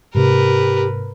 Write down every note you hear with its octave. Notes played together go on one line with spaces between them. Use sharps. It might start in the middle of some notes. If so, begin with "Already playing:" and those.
G#2 C3 G4 A#4 B4